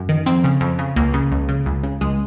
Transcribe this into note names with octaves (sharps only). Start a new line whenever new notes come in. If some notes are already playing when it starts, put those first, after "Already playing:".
Already playing: F#2
D#3
F2 C4
C#3
F2
C#3
C#2 A#3
C#3
C#2
C#3
C#2
C#3
C#2 G#3